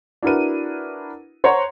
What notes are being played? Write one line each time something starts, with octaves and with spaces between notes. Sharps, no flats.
D4 E4 F#4 A#4 B4 D#7
C5 C#5 F#5 A#5 C6 C#6